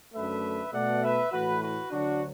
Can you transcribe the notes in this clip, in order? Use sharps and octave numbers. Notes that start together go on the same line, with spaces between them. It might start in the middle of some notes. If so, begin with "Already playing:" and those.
F#2 D3 A3 B4 E5
B2 A3 D5 F#5
B4 E5
A2 E3 A3 F#4 B4
F#4 B4
D2 D3 F#3 D4 F#4